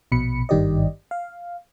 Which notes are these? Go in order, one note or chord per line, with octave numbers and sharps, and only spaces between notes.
A#1 B2 B5 C#7
G#1 G2 D#3 G4 D5 D#5
F5